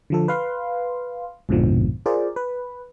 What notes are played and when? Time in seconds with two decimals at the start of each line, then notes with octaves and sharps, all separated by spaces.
0.10 D3 F3 A4
0.28 B4 F5 C6
1.49 A#1 F2 G#2 B2 D3 F3
2.06 F4 G#4 A#4 C5 D5
2.36 B4